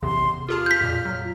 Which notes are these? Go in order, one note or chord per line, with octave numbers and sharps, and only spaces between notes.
A1 E2 C3 C6
F4 G4 G#4 A5 F6
G6 B6
F2 A#2
F#3